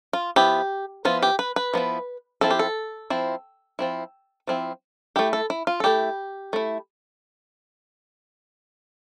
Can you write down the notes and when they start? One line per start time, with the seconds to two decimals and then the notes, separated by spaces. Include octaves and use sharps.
0.13 F4
0.36 F3 B3 E4 G4
1.05 F3 B3 E4 F4
1.22 G4
1.39 B4
1.56 B4
1.74 F3 B3 E4
2.41 F3 C4 E4 A4
2.51 G4
2.59 A4
3.10 F3 C4 E4
3.79 F3 C4 E4
4.47 F3 C4 E4
5.16 A3 E4 G4
5.33 A4
5.50 E4
5.67 F4
5.80 A4
5.84 A3 E4 G4
6.53 A3 E4